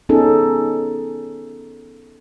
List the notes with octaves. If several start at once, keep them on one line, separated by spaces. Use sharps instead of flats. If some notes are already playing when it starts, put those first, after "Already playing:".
B3 C#4 D#4 G#4 A4